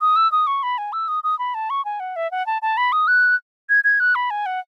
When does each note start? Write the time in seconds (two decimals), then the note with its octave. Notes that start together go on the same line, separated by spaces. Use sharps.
0.01 D#6
0.16 E6
0.32 D#6
0.47 C#6
0.63 B5
0.78 G#5
0.93 E6
1.08 D#6
1.24 D#6
1.39 B5
1.55 A5
1.70 C#6
1.85 G#5
2.00 F#5
2.16 E5
2.31 F#5
2.47 A5
2.62 A5
2.77 B5
2.92 D#6
3.08 F#6
3.69 G#6
3.84 G#6
4.00 F#6
4.15 B5
4.31 G#5
4.46 F#5